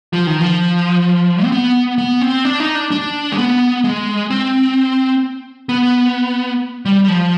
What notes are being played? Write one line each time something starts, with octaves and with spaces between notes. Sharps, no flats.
F3
D#3
F3
C4
B3
B3
C4
D4
D#4
D4
D4
G#3
B3
G#3
C4
B3
G3
G3
F3